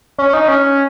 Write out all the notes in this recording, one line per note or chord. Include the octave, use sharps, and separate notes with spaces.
C#4
C#4
D#4
C#4